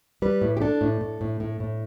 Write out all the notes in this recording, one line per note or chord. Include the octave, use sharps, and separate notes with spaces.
G3 B4
A2
G4
D4 A4
A2
A2
A2
A2
A2